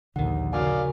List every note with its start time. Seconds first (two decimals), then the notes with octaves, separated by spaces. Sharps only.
0.16 A#1 D#2 D3 D#3 F#5
0.53 C#3 F#4 A#4 D5 F5 G#5